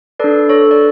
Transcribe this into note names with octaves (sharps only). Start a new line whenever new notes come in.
D4 A4 B4 D5
A4 C#5
D5